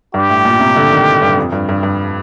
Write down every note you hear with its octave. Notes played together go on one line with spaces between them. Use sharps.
G2 G4
A2
A#2
C3
D3
D#3
G2
F2
G2
G2
G2